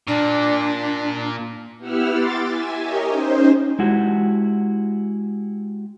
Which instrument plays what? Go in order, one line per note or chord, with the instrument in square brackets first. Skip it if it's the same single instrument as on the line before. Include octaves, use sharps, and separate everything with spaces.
[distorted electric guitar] A#2 [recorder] D4
[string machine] B3 E4 G4 F#5 E6 F6
C6 D6 A6
E5 G#5
G4 A#4 C#5 D#5
C#4 D#4 C5
[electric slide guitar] G#3 E4 F#4 G4